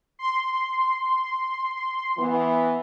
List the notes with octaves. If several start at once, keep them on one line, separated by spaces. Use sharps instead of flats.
C6
E3 B3